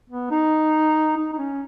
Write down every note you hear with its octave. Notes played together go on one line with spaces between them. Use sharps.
B3
D#4
D#4
D#4
C#4